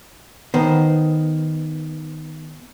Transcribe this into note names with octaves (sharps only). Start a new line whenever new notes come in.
D#3 B3 C5